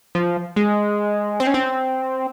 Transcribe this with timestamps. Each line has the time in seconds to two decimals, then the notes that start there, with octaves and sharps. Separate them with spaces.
0.15 F3
0.56 G#3
1.40 C4
1.47 C#4
1.54 C4